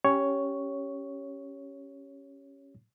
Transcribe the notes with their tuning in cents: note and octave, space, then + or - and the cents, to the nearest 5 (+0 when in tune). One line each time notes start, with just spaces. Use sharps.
C#4 +0 G4 +0 C#5 +5